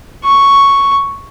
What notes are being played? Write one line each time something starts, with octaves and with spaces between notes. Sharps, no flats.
C#6